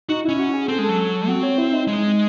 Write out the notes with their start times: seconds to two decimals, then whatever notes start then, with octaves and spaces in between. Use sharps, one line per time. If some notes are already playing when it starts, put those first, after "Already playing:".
0.09 D#4 F#4
0.24 C#4 E4
0.39 F#4
0.54 G#4
0.68 C4 A4
0.79 G#3
0.84 A4
0.89 F#3
1.28 C4 F#4
1.43 C#5
1.58 E4
1.73 D#4
1.88 G#3